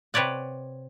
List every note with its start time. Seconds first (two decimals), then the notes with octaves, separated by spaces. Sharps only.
0.14 C3 B4 C#5 D5 F#5